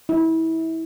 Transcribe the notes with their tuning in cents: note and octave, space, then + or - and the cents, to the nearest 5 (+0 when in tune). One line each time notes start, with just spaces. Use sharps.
E4 -25